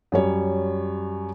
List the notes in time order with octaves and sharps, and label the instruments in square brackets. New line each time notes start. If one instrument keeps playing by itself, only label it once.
[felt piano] F#2 G3 C#5